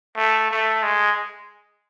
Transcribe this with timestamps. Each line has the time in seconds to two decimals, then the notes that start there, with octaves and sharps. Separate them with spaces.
0.17 A3
0.51 A3
0.83 G#3